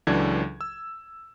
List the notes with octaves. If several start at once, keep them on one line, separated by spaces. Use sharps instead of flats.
C#2 E3 F#3 D4 A4 G#6
E6